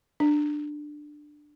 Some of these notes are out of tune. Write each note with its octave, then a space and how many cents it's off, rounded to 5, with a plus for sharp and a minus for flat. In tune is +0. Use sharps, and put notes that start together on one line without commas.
D4 +15